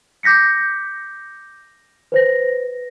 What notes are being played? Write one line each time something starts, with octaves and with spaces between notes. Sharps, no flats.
D6 G6 A#6 B6 C#7
B4 C5 A#6